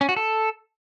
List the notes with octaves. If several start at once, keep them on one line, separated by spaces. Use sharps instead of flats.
C#4
F#4
A4